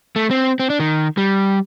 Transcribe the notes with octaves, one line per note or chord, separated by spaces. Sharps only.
A3
C4
C4
D4
D#3
G3